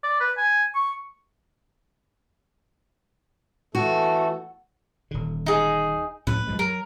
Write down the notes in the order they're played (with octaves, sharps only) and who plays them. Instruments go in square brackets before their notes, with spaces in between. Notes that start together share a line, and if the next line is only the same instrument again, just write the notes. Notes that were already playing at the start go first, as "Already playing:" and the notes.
[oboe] D5
B4
G#5
C#6
[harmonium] E3 A3 A4 [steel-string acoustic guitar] F#4
[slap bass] D#1 D3
[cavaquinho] D#4 G#4
[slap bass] F2 A2 C#4 [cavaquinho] B4
[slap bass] F#2 F3 G#3
[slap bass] F#3 [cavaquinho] A#4